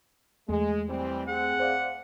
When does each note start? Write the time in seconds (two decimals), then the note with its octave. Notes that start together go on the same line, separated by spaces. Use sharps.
0.49 E2 G#3 A3
0.88 E3 G3 C4
1.28 C4 G#4 F#5
1.60 C5 D5 F5